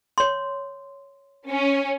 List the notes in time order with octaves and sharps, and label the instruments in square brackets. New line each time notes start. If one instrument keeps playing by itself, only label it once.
[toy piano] C#5 C6
[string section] C#4